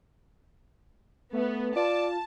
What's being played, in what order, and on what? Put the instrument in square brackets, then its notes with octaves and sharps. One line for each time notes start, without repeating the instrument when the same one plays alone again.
[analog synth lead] A3 [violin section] B3
[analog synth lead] F4 [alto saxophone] D5 [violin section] A5